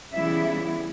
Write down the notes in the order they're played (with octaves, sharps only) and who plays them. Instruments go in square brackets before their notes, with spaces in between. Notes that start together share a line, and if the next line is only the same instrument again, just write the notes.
[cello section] C#3 E3 G3 B3 E4 E5